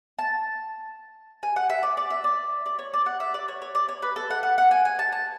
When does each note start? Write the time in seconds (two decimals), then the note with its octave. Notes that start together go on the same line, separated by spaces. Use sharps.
0.19 A5
1.43 G#5
1.56 F#5
1.70 E5
1.83 D5
1.97 D5
2.10 E5
2.24 D5
2.66 D5
2.79 C#5
2.94 D5
3.06 F#5
3.20 E5
3.34 D5
3.48 C#5
3.62 C#5
3.75 D5
3.89 C#5
4.02 B4
4.16 A4
4.30 F#5
4.43 F#5
4.58 F#5
4.71 G#5
4.85 G#5
4.99 A5
5.12 A5